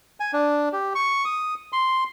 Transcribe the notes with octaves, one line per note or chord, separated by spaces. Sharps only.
G#5
D4
G4
C#6
D#6
C6